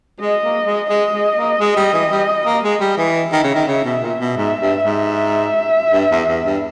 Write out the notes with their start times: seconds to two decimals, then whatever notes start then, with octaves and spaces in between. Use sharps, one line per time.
0.20 G#3 D#5
0.43 A#3
0.66 G#3
0.89 G#3 D#5
1.13 G#3
1.36 A#3
1.59 G#3
1.77 G3
1.93 E3
2.11 G3
2.46 A#3
2.63 G#3
2.81 G3
2.97 E3 E5
3.32 D#3
3.44 C#3
3.55 D#3
3.67 C#3
3.84 B2
4.02 A#2
4.20 B2
4.36 G#2 E5
4.60 G2
4.84 G#2
5.06 E5
5.92 G2
6.10 E2
6.28 E2
6.45 G2